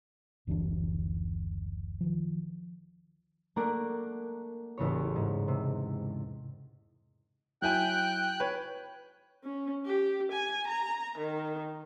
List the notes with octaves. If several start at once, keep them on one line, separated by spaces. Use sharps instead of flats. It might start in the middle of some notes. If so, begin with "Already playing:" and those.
F#1 D2 E3 D4
D#3 F3
A3 A#3 D4 A#4 D5 F#5
A1 E2 C#3 C#5
G#2
C3
F#3 E4 G5 G#5 F#6
B4 C#5
C#4
G4
G#5
A#5
D#3